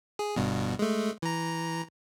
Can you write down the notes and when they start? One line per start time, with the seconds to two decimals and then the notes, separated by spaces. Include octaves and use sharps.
0.19 G#4
0.36 G1 G2 B2
0.79 G#3 A3
1.22 E3 A#5